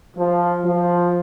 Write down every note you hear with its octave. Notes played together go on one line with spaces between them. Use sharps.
F3
F3